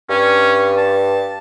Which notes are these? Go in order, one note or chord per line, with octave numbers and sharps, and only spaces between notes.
G2 C#4
A5